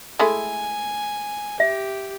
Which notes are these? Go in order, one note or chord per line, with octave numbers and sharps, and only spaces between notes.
G#3 A3 E4 G#5
G4 E5